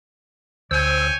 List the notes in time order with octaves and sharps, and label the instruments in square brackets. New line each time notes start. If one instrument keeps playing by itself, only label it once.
[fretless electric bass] D2 [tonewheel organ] C5 E6 [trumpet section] C#5 G5 G#5